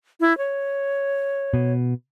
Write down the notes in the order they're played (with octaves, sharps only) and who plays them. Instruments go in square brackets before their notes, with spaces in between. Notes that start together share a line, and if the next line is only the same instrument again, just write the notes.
[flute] E4
C#5
[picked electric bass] B2